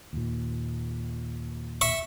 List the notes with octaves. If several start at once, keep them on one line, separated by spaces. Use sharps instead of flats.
D#2 A#2
E5 C#6